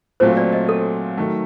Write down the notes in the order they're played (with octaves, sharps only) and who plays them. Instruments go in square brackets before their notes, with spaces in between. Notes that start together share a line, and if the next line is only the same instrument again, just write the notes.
[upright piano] A#2 F#3 A3 C4 F4 [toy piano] C5
[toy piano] D5
D#5
A4
[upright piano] D#3 F#3 A3